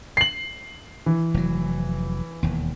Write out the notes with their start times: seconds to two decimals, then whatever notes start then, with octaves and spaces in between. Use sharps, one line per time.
0.17 C7 F#7
1.06 E3
1.34 F1 F#3
2.43 E1 D#2